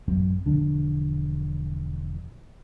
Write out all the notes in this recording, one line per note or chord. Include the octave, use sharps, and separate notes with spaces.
A1 F#2 F#3 C4
E1 D3 F3 D4